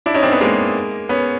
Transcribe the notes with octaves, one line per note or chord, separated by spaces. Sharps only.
D4 E4
C#4 D#4
C4 D4
B3 C#4
G#3 A#3
B3 C#4